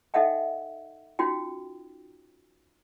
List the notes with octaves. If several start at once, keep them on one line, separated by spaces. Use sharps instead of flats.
D#4 A4 D#5 E5 F#5 G5
C#4 D#4 F4 F#4 G5